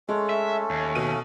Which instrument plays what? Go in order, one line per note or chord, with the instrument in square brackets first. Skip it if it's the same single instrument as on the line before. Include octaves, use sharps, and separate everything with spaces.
[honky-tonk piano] G#3 [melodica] A3 C#4 A4
[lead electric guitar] E5
D#2
[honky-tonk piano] B2 D#7